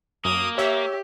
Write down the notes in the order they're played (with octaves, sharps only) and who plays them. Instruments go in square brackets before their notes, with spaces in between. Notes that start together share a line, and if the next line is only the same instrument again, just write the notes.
[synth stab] F#2 [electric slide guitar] A#3 [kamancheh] D#6
[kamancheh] G4 [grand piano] C#5 [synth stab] E5